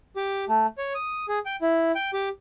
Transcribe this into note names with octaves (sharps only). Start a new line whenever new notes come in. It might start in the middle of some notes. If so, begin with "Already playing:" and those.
G4
A3
C#5
D#6
G#4
G5
E4
G5
G4